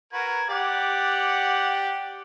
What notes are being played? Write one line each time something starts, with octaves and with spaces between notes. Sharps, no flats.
F#4 A#4 B4 G#6
G4 D5 F#5